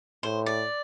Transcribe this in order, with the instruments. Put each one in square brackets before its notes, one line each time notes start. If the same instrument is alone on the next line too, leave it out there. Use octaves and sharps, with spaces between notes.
[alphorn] A2 [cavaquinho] C5
[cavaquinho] D5